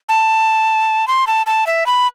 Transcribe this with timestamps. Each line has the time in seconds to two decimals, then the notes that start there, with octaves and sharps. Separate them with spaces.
0.09 A5
1.08 C6
1.27 A5
1.46 A5
1.67 E5
1.86 B5